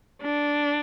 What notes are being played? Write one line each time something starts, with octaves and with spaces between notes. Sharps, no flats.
D4